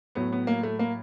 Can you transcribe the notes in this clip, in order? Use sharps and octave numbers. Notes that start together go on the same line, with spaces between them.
A2 F#3 B3
B3
A#3
A3
A#3